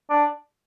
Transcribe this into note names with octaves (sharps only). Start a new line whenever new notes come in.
D4